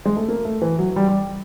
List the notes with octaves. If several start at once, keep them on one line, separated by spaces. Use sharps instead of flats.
G#3
A3
A#3
A3
E3
F#3
G3
G3